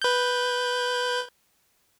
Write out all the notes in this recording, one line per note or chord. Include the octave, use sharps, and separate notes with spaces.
B4 G6